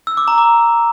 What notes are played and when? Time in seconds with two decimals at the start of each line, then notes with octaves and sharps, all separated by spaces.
0.07 E6
0.17 D6
0.28 A#5
0.38 D6